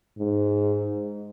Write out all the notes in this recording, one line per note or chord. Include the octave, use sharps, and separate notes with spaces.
G#2